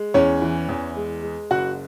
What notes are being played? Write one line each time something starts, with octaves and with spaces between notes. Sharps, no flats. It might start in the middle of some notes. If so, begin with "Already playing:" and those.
Already playing: G#3
E2 C#4 C#5
E3
E2
G#3
G#3
F#1 F#4 F#5